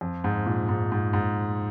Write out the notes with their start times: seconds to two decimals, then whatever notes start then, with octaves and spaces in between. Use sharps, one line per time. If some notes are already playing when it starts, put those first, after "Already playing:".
0.01 F2
0.24 G#2
0.46 A#2
0.69 G#2
0.92 G#2
1.13 G#2